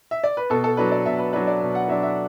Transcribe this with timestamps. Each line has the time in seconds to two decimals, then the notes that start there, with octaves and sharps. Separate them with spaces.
0.11 E5
0.24 D5
0.37 B4
0.50 B2 A4
0.64 A4
0.77 F#3 D4 B4
0.92 D5
1.06 B2 E5
1.19 B4
1.33 F#3 D4 B4
1.47 D5
1.61 B2
1.75 F#5
1.88 F#3 D4 E5
2.03 E5